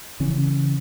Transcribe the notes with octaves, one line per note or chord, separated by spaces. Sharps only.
C#3 E3 C#4